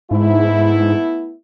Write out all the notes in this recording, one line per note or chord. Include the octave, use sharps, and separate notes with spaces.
G#2 A3 B3 E4